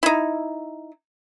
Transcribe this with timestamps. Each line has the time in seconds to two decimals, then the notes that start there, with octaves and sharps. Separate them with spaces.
0.03 D#4 E4